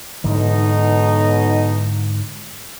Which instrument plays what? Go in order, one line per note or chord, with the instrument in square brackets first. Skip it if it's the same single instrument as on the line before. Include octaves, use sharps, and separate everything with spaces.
[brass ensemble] B1 B2 D#4 [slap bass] G#2 D3 E3